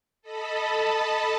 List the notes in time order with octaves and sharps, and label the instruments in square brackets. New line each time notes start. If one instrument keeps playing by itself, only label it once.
[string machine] A4 D#5 A5 B5